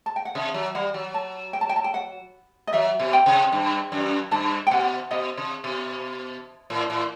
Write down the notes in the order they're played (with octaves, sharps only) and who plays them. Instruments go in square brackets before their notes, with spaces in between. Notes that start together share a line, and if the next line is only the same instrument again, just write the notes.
[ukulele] A5
G5
F#5
[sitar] C3 [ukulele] E5
[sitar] F#3
[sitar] G3 [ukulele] F#5
[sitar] F#3
[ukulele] A5
G5
A5
G5
A5
G5
F#5
D#5
[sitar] F#3 [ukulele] E5
[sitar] B2
[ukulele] G5
[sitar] C3
G2
F#2
[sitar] G2 [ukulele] A5
[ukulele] G5
[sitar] B2 [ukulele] F#5
[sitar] B2 [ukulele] D#5
[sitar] C3
B2
A2
A2